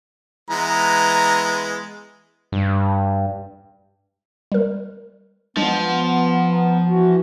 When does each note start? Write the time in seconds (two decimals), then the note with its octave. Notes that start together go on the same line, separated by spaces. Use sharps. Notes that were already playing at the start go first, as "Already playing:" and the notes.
0.51 E3 G#3 B3 A#5
2.52 G2
4.52 G3 A#4
5.57 F3 F#3 G#3 B3 D4
6.53 A#5
6.89 E3 F#4